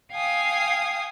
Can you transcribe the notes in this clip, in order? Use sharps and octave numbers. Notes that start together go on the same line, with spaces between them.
F5 G5 G#5 D#6